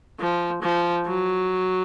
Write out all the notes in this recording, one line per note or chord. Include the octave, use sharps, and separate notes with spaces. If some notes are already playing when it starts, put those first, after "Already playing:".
F3
F3
F#3